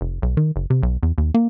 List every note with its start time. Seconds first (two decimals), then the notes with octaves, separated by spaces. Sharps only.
0.01 F1
0.22 B1
0.37 D#3
0.56 F#1
0.70 C3
0.83 B1
1.03 E2
1.18 D#2
1.34 A#3